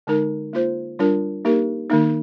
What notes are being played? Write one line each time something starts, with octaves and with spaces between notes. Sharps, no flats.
D3 G#3 D#4 A#4
A#3 F4 C5
G3 D4 F4 A#4
A#3 D#4 G4 A#4
D#3 A#3 D#4